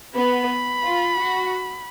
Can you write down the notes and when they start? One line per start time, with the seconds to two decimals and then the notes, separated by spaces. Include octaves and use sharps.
0.14 B3 B5
0.84 F4
1.18 F#4